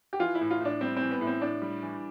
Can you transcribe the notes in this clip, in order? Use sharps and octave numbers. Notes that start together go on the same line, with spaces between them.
G4
E3 F4
E4
A2
F4
A2 D4
G3 C4
E3 C4
B3
A2
C4
A2 D4
G3
E3